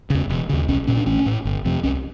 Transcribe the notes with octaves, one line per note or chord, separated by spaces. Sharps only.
E2 C#3
E1
D#2 C#3
B1 C#4
A#2 C#4
D4
A1 C#4
A2
G1
F2 C3
C2 C#4